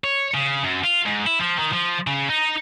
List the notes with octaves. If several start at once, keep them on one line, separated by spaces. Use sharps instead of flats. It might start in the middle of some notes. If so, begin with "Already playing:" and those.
C#5
C#3
F#2
F4
G#2
E4
F3
D#3
F3
C#3
D#4